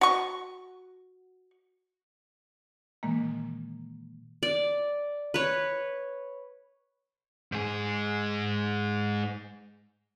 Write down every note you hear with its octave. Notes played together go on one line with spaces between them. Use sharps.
F#4 C#6
A#2 D#3 E3 G#3 A#3
D5
B4 C#5
G#2 G#4